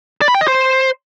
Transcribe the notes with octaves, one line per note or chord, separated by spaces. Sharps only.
D5
B5
G5
D#5
C5